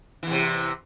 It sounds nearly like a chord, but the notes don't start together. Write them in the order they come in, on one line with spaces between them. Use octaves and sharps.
E3 E2 C3